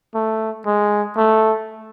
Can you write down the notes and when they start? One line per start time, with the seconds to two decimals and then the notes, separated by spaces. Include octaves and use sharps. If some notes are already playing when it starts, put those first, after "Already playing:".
0.15 A3
0.66 G#3
1.17 A3